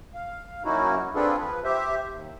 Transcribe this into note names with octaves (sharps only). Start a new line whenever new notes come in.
F5
F#3 A#3 C#4 D#4 E4 F#4
C4 D4 F4 G#4 A4 B4
F3 B4
G4 C5 E5
D#2